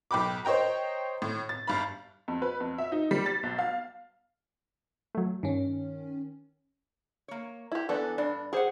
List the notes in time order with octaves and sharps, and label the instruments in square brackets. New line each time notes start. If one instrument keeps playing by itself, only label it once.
[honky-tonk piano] B1 G5 B5 D6
C5 C#5 D#5 G5 A#5
A2
A6
G1 F5 B5
F2
B4
F2
E5
D#4
G3
A6
B1
F5
[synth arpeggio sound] F#3 A3
[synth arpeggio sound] G2 [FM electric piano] D#3 C#4
[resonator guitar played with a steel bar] A#3 C#5
[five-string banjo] E4 G4
[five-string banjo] E3 B3 D4 [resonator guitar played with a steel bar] A4
[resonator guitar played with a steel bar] G2 [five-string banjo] D4
[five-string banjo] G4 C5 [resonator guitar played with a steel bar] G#4 F#5